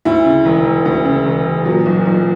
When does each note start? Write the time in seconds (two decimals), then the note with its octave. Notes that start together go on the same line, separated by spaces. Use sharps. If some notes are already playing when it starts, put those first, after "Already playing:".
0.05 D2 E4
0.25 C#3
0.45 E1
0.65 E1
0.85 D2
1.05 C#3
1.25 E1
1.45 E1
1.65 A#2 F#3
1.86 B1
2.06 B1